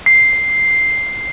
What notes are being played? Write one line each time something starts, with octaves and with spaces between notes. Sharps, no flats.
C7